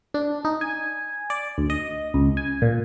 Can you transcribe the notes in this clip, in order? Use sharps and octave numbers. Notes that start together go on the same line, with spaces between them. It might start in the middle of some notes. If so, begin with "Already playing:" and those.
D4
D#4
G#5
D5
D2
D#5
C#2
G#5
A#2